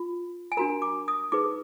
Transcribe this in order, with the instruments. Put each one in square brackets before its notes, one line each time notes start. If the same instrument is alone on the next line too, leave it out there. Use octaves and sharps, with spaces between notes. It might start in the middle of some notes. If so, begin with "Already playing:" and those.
Already playing: [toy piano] F4
G#5
D4 F#4 A#4 A#5
D6
D#6
D#4 G#4 B4 D6